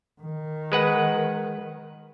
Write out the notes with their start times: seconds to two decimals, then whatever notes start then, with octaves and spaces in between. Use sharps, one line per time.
0.21 D#3
0.72 G#3 B4 F#5